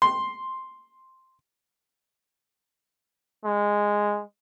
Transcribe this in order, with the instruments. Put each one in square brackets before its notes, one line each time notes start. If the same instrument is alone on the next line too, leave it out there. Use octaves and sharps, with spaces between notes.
[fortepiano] C6
[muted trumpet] G#3